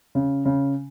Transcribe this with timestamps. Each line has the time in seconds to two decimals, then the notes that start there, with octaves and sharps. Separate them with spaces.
0.15 C#3
0.45 C#3